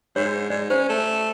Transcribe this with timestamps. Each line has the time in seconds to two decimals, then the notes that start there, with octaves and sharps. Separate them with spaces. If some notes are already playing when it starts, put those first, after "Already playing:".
0.16 G#2 C#5
0.50 G#2 D5
0.70 C#4 C5
0.89 A3